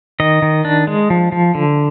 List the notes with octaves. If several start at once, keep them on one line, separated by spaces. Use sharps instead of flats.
D#3 D#5
D#3
D4
G#3
F3
F3
D3